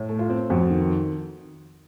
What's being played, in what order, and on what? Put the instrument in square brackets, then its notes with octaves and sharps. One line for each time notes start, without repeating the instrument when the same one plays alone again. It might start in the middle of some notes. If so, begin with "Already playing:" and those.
Already playing: [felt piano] A2
A3
F4
C4
F2 F#4
D#3